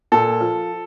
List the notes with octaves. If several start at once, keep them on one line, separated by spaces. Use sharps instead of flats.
A#2 A4
F3